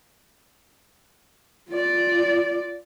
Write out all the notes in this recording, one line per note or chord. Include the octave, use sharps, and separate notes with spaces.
F4 D5